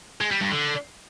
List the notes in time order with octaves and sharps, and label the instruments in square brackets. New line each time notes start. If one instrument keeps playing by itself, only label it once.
[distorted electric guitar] G#3
G3
G2
D3